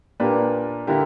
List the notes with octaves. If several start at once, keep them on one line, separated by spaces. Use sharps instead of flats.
A#2 A#3 D4 G4 B4
D3 A#3 E4 G4